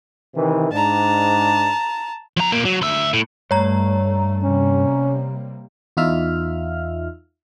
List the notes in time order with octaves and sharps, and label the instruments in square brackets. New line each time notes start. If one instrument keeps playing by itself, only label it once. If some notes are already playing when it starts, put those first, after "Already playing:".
[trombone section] C3 D#3 E3
[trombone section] G#2 D4 [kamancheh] A5 A#5
[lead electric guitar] F3 A#5
A#2 A#3
F#3
D2 E5
A2
[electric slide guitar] G2 [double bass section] A3 [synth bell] C#5 A#5
[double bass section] C3 G3 A#3 [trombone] C#4
[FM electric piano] E2 D#4 F4 E5 F6